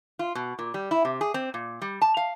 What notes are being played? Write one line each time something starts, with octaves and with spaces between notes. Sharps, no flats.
F4
B2
A#2
G3
E4
C3
G#4
C4
A#2
G3
A5
F5